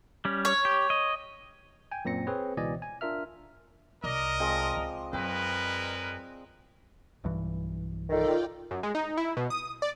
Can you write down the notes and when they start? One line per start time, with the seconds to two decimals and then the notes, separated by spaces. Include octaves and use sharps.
0.25 G3 C#4
0.45 C#5
0.65 G4
0.90 D#5
1.92 G5 G#5
2.05 F#2 A#2 C4 A#6 C#7
2.27 C4 G#4 B4 C#5
2.57 C#2 B2 E3 D5 D#5 G#5
2.82 G#5
3.01 D4 F4 A#4 E5 F6
4.04 C2 A#4 D5 D#5
4.40 F3 G#3 C4
4.77 C#2
5.13 F#2 G#3 C4 A#4 B4
7.24 B1 G2 E3
8.09 D#3 F4 A4 D5 G5
8.71 F#2
8.83 G#3
8.95 D#4
9.17 E4
9.37 B2
9.50 D#6
9.82 D5